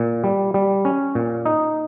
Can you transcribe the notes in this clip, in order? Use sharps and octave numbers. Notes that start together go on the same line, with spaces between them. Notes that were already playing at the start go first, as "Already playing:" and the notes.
Already playing: A#2
G3
G3
C#4
A#2
D#4